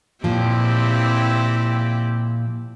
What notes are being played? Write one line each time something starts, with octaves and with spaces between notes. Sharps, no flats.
A#2 F3 C4 E4 G4